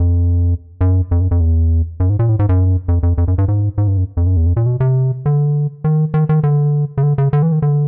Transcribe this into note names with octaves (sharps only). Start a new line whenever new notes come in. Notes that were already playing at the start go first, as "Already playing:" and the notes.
Already playing: F2
F#2
F2
F#2
F2
E2
F#2
G#2
A#2
A2
G#2
F#2
F2
F2
F2
F#2
G2
G#2
G#2
G2
F#2
F2
F#2
E2
F2
A#2
B2
C3
D3
D#3
D#3
D#3
D3
C#3
D3
C#3
D3
E3
D#3
D3